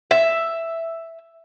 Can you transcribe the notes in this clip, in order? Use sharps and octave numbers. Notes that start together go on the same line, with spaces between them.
E5